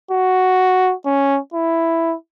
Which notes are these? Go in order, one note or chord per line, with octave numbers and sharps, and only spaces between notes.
F#4
C#4
E4